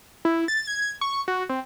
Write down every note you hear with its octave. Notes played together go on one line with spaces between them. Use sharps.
E4
A6
G#6
C#6
F#4
C4